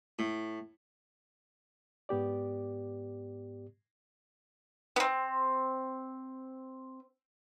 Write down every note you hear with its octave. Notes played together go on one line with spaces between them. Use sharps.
A2
G#2 B3 G4 D5
B3 C4